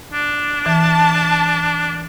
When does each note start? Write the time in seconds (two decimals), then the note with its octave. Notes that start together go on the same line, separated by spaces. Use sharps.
0.13 D4
0.66 E3 A5